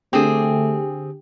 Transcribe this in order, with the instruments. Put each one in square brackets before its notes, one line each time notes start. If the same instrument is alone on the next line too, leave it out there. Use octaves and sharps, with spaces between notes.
[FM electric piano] D3 G4 [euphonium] A3 [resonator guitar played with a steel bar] C4 G#4